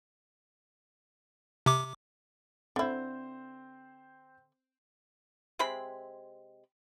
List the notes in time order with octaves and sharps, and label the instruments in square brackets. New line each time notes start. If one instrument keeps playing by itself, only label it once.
[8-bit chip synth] C3 D6
[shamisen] D3 E4 [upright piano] C4 C5
[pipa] C3 G#3 C4 B5